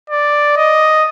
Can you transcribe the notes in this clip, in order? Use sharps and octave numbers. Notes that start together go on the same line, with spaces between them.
D5
D#5